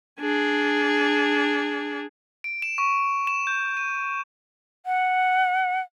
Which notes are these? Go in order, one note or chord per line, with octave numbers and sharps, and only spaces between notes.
D4 G#4
D7
E7
C#6
E7
G6
D#7
F#5